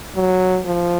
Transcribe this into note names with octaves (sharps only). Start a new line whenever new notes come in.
F#3
F3